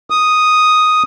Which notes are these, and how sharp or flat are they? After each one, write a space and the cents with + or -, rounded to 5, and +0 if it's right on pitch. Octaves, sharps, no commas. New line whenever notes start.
D#6 +0